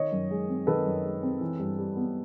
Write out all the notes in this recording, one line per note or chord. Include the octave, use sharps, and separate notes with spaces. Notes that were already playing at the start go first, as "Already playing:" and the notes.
Already playing: D#3 C#5 D#5
F#2
G#3
C4
D#3 A4 B4
F#2
G#3
C4
E3
G2
G3
B3